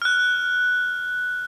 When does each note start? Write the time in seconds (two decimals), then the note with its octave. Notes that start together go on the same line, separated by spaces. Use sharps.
0.02 F6 F#6